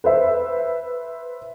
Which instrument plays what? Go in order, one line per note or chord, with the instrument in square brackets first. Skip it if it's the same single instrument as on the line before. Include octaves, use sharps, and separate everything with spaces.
[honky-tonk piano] B4 C5 E5